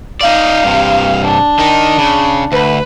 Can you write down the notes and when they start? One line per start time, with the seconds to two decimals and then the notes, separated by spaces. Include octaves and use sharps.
0.21 D#4 D5 F5
0.64 G2 C3
1.24 D4
1.59 D#3 D#4
1.98 C#3
2.52 D2 B4